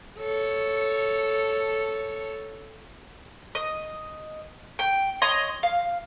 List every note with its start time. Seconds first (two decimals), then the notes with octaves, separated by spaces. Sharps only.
0.19 A4 C#5
3.55 D#5
4.79 G5
5.22 C#5 D#5 C6 D#6
5.63 F5